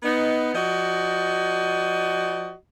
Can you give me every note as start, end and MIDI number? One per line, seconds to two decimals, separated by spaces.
0.02 0.53 59
0.02 0.53 63
0.54 2.52 53
0.54 2.52 66
0.54 2.52 74
0.54 2.52 75